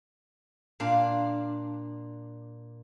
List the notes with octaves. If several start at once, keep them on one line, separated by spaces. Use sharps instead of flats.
A#2 D4 F5